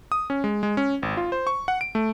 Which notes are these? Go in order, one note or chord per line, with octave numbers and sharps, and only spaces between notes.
D#6
C#4
G#3
G#3
C#4
G#1
F4
C5
C#6
F#5
D7
A3